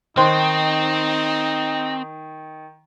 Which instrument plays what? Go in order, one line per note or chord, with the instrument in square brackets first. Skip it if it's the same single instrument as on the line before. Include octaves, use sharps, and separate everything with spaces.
[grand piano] D#3 [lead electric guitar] C4 [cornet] D#4 [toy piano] C5 C6